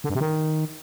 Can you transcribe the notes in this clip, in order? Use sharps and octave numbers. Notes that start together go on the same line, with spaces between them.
D3
G2
C3
D#3